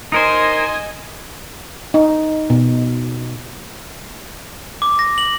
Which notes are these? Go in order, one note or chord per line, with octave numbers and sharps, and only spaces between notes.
D#4 A#4 C5 D#5 G#5
D#4
B2
D6
A#6
F#7